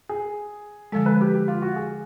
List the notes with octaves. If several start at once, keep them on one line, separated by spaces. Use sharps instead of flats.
G#4
D3 F3 G#3 A4
B4
G4
G4
F4
F#4
G#4